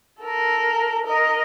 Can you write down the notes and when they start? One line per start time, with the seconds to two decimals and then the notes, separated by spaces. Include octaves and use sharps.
0.21 A4 A#4
1.05 A#4 D#5